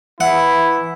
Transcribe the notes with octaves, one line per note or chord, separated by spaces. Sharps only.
E3 E4 E5 F#5